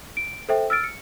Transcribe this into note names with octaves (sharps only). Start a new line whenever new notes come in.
D7
A4 C5 E5 G5
E6 F6 A6 D7
C#7